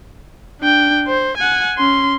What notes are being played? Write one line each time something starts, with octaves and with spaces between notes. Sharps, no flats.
D4 G5
C5
F#5 G#5
C#4 C6